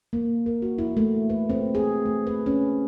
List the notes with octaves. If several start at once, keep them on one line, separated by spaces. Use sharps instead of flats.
A#3
A#4
F#4
E4
A3
B4
C4
G#4
A3
B4
C#4